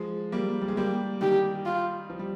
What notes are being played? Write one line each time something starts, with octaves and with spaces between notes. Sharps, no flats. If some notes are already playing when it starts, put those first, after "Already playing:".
Already playing: F3 G#3
G3 A#3
G3
G#3
G3 A#3 G4
D#3 G3 G4
F4
F3
G3